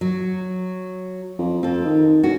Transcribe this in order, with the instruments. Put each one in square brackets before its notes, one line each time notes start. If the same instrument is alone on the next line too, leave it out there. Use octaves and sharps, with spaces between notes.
[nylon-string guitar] F#3
[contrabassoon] F2
[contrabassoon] F2 [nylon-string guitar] C4 A4
[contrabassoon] D#3
[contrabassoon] E1 [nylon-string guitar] C#4 F#4